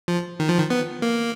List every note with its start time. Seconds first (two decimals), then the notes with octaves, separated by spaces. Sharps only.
0.08 F3
0.40 D#3
0.49 F3
0.58 D#3
0.70 B3
1.02 A#3